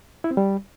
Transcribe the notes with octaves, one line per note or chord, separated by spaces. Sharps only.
E4
C4
G3